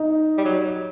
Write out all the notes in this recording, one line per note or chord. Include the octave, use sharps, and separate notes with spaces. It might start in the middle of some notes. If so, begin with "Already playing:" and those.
Already playing: D#4
G3
F#3